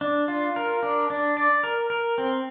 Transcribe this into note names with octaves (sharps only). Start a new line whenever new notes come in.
D4
F4
A#4
D4
D4
D5
A#4
A#4
C4